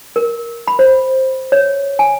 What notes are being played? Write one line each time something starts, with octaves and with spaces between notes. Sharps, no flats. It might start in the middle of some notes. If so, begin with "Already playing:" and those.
A#4
B5
C5
C#5
G#5